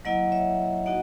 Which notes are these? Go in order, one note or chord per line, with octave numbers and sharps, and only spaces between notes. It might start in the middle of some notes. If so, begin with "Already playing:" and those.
F#3 A#3 E4 D#5 F#5
C#5 E5
A#3 D#4 F#4 D#5 F#5